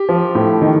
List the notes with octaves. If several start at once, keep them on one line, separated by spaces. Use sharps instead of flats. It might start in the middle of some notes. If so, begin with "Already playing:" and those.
Already playing: G4
F3
A2
D#3